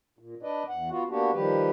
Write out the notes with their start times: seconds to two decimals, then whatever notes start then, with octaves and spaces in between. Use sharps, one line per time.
0.19 A#2
0.43 D4 B4 D5 D#5
0.69 E2 F#5
0.90 B3 F4 F#4
1.09 A#3 B3 D4 F#4 G4
1.33 D#3 F3 G3 G4 B4